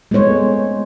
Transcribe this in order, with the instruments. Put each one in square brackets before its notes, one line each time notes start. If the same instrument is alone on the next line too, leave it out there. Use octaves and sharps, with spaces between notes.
[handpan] G#3 A3 B3 C5 C#5